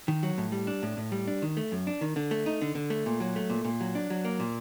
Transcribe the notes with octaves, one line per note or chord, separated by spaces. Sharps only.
D#3
F#3
A2
G3
D4
A2
A2
G3
D4
D#3
A3
F#2
D4
D#3
D3
A3
D#4
D3
D3
A3
A#2
F#3
A3
A#2
A#2
F#3
D4
F#3
A#3
A#2